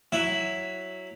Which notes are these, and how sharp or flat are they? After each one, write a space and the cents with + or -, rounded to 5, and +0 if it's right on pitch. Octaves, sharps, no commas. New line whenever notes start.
F#3 +0 E4 +0 E5 +0